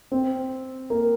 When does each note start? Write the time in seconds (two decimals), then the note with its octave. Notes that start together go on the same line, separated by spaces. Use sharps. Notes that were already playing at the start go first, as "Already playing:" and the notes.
0.12 C4
0.90 A#3